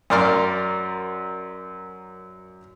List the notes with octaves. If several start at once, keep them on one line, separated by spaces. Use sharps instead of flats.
F#2 A#4 D5 C6 F6